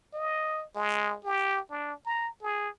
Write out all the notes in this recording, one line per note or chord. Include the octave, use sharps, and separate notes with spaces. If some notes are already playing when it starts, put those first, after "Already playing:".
D#5
G#3
G4
D4
A#5
G#4